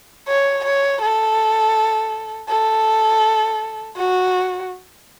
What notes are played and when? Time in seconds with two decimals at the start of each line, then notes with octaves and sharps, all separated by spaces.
0.28 C#5
0.65 C#5
1.01 A4
2.49 A4
3.97 F#4